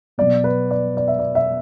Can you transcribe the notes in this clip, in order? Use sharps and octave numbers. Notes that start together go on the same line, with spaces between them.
B2 F#3 B3 D5
B4
D5
D5
E5
D5
E5